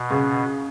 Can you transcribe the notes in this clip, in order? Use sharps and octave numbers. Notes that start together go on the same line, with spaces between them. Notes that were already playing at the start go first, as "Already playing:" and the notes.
Already playing: B2
C#3